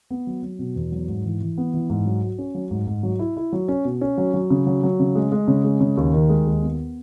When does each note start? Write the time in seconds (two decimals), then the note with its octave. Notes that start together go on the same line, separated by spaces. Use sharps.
0.10 B3
0.27 F#3
0.43 F#3
0.59 B2
0.76 E2
0.92 F#3
1.08 G#2
1.24 E3
1.41 E3
1.58 B3
1.74 E3
1.90 G#2
2.06 F#3
2.22 F#4
2.38 C#4
2.55 F#3
2.71 G#2
2.87 G#2
3.03 F#3
3.19 E4
3.37 E4
3.52 F#3
3.68 C#4
3.85 B2
4.01 C#4
4.18 F#3
4.34 F#3
4.50 C#3
4.67 F#3
4.83 F#3
5.00 C#3
5.15 G#3
5.32 G#3
5.48 C#3
5.64 G#3
5.81 C#3
5.97 D#2
6.13 D#3
6.29 G#3
6.47 D#2
6.62 B3